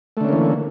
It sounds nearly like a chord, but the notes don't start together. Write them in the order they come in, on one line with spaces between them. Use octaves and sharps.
A3 D3 C#4 A#3 E3